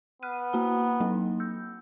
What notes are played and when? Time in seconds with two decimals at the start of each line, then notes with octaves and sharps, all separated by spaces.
0.23 B3 F6 F#6 D#7
0.53 A#3 F#4 A#5
1.00 F#3 A#3 D#4
1.40 E6 G6